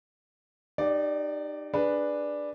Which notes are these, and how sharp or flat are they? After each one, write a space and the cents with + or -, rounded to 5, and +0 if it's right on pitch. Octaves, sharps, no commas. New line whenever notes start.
D#4 -30 G4 +5 D5 +0
D4 +5 G#4 +0 B4 +0